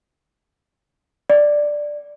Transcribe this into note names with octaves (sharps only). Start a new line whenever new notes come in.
D5